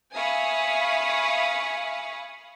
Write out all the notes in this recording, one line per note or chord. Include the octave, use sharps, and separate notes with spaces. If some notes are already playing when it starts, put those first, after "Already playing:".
E5 F5 G#5 B5 C#6 D#6